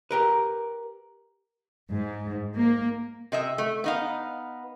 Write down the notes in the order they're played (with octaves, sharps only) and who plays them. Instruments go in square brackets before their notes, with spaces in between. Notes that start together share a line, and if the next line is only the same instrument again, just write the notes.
[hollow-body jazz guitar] G4 A#4 B4
[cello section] G#2
A#3
[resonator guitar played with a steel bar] C3 D#5 E5
A3
B3 D#4 F5